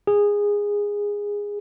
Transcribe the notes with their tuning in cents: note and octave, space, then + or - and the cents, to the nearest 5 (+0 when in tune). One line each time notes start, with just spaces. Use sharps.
G#4 -15